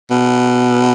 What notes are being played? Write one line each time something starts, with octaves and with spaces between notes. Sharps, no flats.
B2